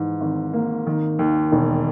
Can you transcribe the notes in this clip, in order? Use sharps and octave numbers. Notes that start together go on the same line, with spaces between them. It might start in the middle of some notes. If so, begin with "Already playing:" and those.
Already playing: G#2 E3
G#1
A#3
D#3
D#2
E1